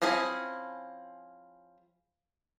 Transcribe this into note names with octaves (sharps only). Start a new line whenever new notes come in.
F3 C4 C#4 E4 G#4